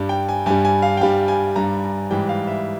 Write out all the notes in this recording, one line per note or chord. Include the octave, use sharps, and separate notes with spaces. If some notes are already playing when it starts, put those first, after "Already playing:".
Already playing: G2 G3
G5
G#5
G2 G3 G#5
G#5
F5
G5
G2 G3 F5
G#5
G2 G3 A#5
A#5
G#2 E3 G3 G5
F5
E5